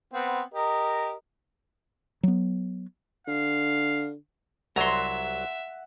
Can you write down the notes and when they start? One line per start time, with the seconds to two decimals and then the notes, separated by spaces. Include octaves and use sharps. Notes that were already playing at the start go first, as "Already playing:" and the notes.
0.13 B3 C4
0.54 G4 A#4 D#5
2.23 F#3 B3
3.27 D3 F5
4.76 C2 F#3 E5 F#5 A#5 C6